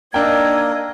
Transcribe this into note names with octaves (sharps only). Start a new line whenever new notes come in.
A#3 D4 D#4 A#4 D#5 G5 E6 G#6